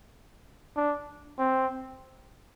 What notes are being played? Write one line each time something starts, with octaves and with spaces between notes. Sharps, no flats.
D4
C4